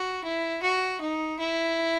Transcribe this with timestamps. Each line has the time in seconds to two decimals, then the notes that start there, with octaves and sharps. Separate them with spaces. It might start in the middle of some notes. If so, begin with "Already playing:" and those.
Already playing: F#4
0.24 E4
0.63 F#4
1.01 D#4
1.40 E4